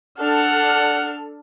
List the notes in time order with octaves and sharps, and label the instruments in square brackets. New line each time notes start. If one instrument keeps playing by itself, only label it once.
[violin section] D4 A4 F6 [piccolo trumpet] F#5